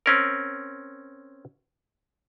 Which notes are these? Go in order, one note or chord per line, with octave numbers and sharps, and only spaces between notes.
C4 C#4 A#4